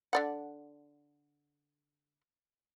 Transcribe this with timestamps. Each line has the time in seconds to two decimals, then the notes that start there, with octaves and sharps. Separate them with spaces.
0.13 D3 D5 F#5